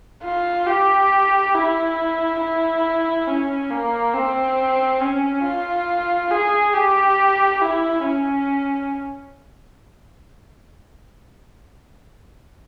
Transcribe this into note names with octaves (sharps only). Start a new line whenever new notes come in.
F4
G4
E4
E4
C#4
A#3
C4
C#4
F4
G#4
G4
E4
C#4